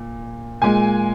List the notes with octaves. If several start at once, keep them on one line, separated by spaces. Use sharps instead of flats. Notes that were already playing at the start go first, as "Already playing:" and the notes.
Already playing: A#2
A#2 G#3 G#5